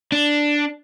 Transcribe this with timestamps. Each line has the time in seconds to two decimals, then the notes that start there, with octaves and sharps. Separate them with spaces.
0.12 D4